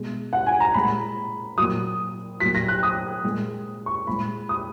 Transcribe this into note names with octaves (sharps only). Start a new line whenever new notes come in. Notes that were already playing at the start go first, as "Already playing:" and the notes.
Already playing: B2 G#3
F#5
G#5
A#5
A#2 G#3 B5
A#2 F#3 D#6
A#2 F#3 B6
A#6
F#6
D#6
A#2 G#3
C#6
A#2 G#3 B5
D#6